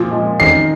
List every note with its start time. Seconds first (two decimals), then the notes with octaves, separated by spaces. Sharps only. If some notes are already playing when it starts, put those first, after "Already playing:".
Already playing: A#2 F3
0.11 G#3
0.40 D#3 C7